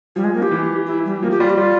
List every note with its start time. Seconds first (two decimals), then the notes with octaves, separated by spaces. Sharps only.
0.16 F3 G3
0.24 G#3
0.34 A#3
0.42 G4
0.51 E3
0.87 E4
1.05 G3
1.22 F3 A#3
1.31 G4
1.40 G3 F4
1.50 G4
1.57 G3 F4